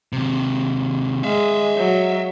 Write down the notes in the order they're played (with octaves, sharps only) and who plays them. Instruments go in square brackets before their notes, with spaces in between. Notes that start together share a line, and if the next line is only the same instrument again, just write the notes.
[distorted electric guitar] D#2 C3
[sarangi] G#3 [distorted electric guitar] E5 F5
[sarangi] F#3